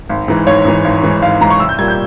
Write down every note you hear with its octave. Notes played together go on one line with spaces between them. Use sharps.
G#1
G#2 E3
G#1 C#5
G#2 E3
G#1
G#2 E3
G#1 F5
G#2 E3 A#5
C#6
C2 E6
G6
A#2 G3 A#3 G#6
G6